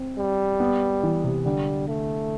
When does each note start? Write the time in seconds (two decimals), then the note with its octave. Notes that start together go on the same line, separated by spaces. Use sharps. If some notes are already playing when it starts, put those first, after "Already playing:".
Already playing: C4
0.18 G3
0.60 B3
1.03 E3
1.24 C3
1.45 D3 G3
1.88 A3